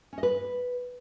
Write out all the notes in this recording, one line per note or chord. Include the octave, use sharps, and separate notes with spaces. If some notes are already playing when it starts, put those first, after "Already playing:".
C#4
D#5
B4